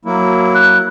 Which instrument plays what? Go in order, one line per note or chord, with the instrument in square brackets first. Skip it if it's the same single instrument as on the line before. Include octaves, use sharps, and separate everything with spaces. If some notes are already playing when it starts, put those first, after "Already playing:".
[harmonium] F#3 A#3 E4
[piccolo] F#6